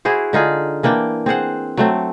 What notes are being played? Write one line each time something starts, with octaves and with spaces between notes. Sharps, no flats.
E4 F#4 G#4 C5
D3 D#4 F4 G#4
E3 A#3 D4 G5
C4 G#4 C5 F#5
F#3 A3 C4